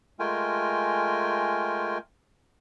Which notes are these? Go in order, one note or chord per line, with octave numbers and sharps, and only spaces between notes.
G#3 A3 F4 A#4 G5 G#5